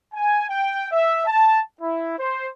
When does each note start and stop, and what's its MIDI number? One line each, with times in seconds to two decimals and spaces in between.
0.13 0.48 80
0.49 0.86 79
0.92 1.22 76
1.26 1.60 81
1.80 2.15 64
2.18 2.46 72